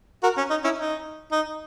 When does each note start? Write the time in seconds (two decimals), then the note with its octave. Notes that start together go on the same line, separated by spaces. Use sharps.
0.23 F#4 A#4
0.37 C#4
0.50 D#4
0.64 C#4 E4
0.78 D#4
1.32 D#4